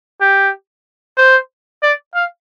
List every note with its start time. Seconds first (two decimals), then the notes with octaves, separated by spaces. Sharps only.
0.21 G4
1.17 C5
1.83 D5
2.15 F5